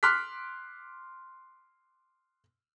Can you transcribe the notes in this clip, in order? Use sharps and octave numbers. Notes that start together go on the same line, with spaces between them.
C6 D6 F6 F#6 B6